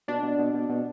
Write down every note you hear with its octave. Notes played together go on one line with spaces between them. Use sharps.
B2 D4
B2
B2
B2
B2